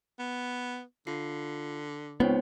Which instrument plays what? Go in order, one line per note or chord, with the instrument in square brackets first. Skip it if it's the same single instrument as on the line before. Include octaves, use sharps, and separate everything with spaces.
[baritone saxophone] B3
[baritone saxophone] D3 [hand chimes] F4 C7
[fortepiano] C#2 C4 [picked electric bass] B3 [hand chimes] D#4 C5 C#5